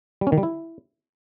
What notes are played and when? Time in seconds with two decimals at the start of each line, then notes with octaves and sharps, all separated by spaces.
0.21 G3
0.27 C#4
0.32 D#3
0.38 G3
0.43 E4